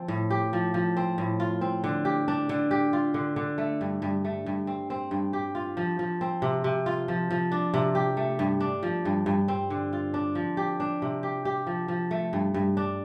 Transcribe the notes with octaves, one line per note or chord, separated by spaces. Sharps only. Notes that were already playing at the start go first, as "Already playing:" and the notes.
Already playing: F3 C4
A2
G4
F3
F3
C4
A2
F4
C4
D3
G4
D4
D3
G4
F4
D3
D3
A3
G2
G2
A3
G2
C4
C4
G2
G4
F4
F3
F3
C4
C3
C3
F4
F3
F3
D4
C3
G4
A3
G2
D4
F3
G2
G2
C4
D3
F4
D4
F3
G4
D4
C3
G4
G4
F3
F3
A3
G2
G2
D4